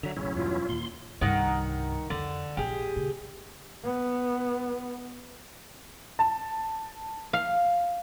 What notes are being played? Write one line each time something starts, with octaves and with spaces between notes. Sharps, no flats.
D3 F#3 E5 A#5
E1 A1 C#3 F#3 C#4 E4
E2 G2 B2 F4
D#2 A#2 C6
C2 G2 D#3 D#4 F#5
F2 D3
A#1 G4 G#4
C#2 A#2
B3
A5
F5